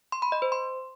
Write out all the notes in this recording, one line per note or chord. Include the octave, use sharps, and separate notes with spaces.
C6
B5
D#5
C5
C6